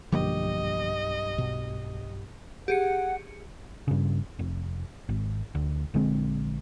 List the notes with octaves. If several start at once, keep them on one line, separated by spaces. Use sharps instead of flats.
B1 G2 D3 F3 A#3 G4 D#5
B2
G4 G#4 F#5 C#7
G2 C#3
F1
G#1
D2
A#1 D3 G#3 C4